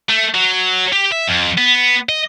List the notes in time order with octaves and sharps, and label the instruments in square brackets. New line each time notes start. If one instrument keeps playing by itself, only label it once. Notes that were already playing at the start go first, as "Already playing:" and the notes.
[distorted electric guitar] A3
F#3
G4
E5
F2
B3
D#5